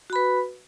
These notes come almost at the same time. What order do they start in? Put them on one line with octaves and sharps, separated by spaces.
F#4 B5 B4